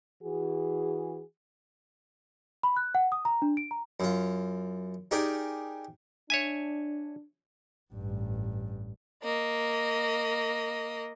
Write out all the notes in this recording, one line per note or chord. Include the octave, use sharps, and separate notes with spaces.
E3 F#4 G#4
B5
F#6
F#5
D#6
A#5
D4
D7
A#5
F#2 F4
D#4 G4 G#4 A#4 D5
D4 C#5 E5 G#5
A1 G2
A#3 D#5